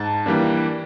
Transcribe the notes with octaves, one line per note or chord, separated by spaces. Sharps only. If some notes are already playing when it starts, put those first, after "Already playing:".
Already playing: G#2 A5
E3 G3 A#3 D4